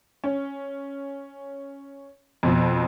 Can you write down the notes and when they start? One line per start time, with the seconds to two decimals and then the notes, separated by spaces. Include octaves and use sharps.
0.24 C#4
2.43 F2 B2